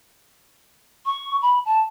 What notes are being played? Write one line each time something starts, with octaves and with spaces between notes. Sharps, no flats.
C#6
B5
A5